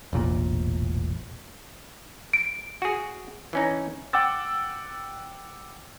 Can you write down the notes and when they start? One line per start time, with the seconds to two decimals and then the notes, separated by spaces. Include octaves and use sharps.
0.13 E1 A1 A#2
2.33 D7
2.82 F#4 G#4
3.53 E3 C#4 D#4
4.13 F#5 G5 D6 E6 A6